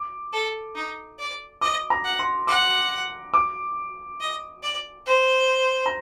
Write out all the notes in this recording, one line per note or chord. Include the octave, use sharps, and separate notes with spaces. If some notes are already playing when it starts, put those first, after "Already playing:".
Already playing: D6
A4
D#4
D5
D#5 D6
A#5
F#5
C6
F#5 D6
D6
D#5
D5
C5
A#5